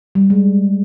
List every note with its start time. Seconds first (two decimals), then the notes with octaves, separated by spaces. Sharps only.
0.15 G3
0.30 G#3